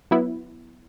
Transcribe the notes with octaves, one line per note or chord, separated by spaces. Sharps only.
F#3 B3 E4